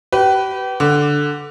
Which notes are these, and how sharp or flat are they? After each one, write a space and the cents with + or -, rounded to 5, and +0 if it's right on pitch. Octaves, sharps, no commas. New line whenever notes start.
G4 -35 B4 +0
D3 +0 D6 +0